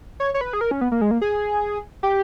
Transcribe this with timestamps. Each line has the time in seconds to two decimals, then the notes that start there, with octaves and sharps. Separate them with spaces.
0.20 C#5
0.34 C#5
0.41 B4
0.53 G#4
0.61 A#4
0.71 C#4
0.81 B3
0.92 A#3
1.01 G#3
1.11 A#3
1.21 G#4
2.03 G4